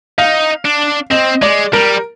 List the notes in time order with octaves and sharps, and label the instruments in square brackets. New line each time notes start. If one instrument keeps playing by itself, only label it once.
[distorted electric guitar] D#4 [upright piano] F5
[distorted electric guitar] D4
[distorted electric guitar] C4 [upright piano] D#5
[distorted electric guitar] G#3 [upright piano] D5
[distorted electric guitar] G3 [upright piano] A#4